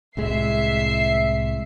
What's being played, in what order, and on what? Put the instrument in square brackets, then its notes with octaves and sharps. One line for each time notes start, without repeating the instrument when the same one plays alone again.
[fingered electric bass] C2 A2 G#3 [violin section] E5 C7